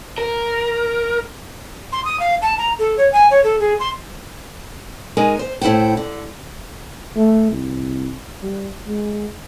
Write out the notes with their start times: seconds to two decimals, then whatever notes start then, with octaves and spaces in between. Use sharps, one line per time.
0.18 A#4
1.92 C6
2.05 D#6
2.20 F5
2.42 A5
2.58 A#5
2.79 A4
2.98 C#5
3.12 G#5
3.31 C#5
3.44 A4
3.60 G#4
3.80 C6
5.17 G#3 D#4 A#4 G#5
5.39 C5
5.61 A2 E4 C5 F#5 G5
5.97 D3
7.16 A3
7.52 C2
8.43 G3
8.87 G#3